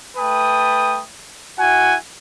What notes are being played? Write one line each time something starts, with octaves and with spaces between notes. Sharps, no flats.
A3 B4 G5 A5 D#6
E4 F#4 F#5 G#5